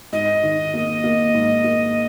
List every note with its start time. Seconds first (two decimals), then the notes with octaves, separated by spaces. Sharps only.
0.13 G#2 D#5
0.43 D#3
0.74 A#3
1.04 A#3
1.34 G#2
1.64 A#3